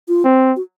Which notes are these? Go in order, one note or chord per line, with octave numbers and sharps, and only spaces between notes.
F4
C4
F#4